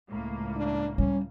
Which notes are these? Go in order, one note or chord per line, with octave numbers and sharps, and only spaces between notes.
C#2 A2 A#3
D4
G3 C#4